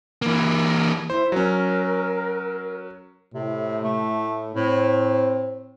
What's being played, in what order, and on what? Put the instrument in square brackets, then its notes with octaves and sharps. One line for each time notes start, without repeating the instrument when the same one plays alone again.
[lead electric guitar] E3 A#3
[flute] E4 [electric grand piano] C5
[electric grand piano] F#3 C#4 [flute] A#4
[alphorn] A2 [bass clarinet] C3
[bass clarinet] A3
[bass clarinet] A2 [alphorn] C4